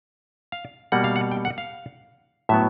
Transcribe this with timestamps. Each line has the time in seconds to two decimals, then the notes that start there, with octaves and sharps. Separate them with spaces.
0.52 F5
0.92 B2 G3 A#3 F#5
1.04 F5
1.16 F#5
1.31 G5
1.45 F#5
1.58 F5
2.49 A2 F#3 B3 E5